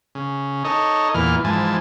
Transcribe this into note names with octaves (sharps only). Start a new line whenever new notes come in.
C#3
D#4 A4 C#5 D#5
E2 A#2 E3 F6
G#2 E3 F3 G#5 A5